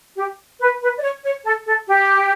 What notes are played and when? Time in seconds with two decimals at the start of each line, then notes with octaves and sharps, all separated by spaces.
0.17 G4
0.60 B4
0.82 B4
0.98 D5
1.02 C#5
1.24 C#5
1.44 A4
1.66 A4
1.87 G4